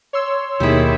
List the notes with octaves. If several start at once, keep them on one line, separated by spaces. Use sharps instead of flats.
C#5 C6 E6
D#2 B2 D#3 A#3 E4 G4 G#4